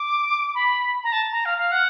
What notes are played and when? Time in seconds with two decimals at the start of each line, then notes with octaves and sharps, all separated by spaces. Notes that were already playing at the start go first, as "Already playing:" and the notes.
Already playing: D6
0.55 B5
1.04 A#5
1.12 A5
1.32 A#5
1.45 F5
1.58 F5
1.72 F#5